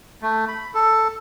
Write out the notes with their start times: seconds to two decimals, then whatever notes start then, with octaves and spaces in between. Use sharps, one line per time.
0.22 A3
0.48 B5
0.74 A4